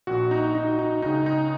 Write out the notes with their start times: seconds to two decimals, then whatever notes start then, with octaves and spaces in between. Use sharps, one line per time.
0.07 A#1 A#2 F#4
0.31 D#4
0.55 D#4
0.79 D#4
1.02 C#2 C#3 D#4
1.26 D#4